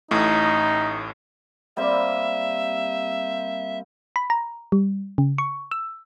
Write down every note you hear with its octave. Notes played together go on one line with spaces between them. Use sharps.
A1 A2 D#4
G3 A#3 C4 E5
B5
A#5
G3
C#3
C#6
E6